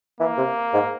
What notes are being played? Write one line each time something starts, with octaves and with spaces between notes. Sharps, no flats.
E3 A#3
C3
G#2